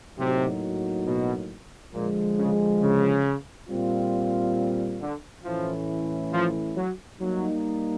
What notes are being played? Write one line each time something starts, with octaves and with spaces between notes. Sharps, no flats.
A2 C3 F#3 A#3 D#4 F#4
B2
A#2 D3 F3 G#3
C#3
C#3
A#2 G3 C4 F4
D3
A2 E3 F3 A3 C#4 E4
F3
F#3
F#3 G3 A#3 D#4